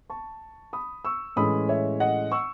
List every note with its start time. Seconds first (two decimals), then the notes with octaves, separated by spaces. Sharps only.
0.10 A5 C#6
0.73 B5 D#6
1.05 C#6 E6
1.36 A2 E3 G#3 C#4 B5 D#6
1.69 C#5 E5
2.00 D#5 F#5
2.32 C#6 E6